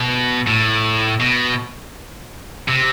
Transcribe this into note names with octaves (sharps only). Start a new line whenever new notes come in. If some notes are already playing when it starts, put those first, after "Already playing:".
Already playing: B2
A2
B2
C3